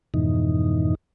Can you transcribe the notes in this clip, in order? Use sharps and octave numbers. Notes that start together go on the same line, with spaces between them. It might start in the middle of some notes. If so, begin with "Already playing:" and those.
F2 G#2 B2 E3 D#4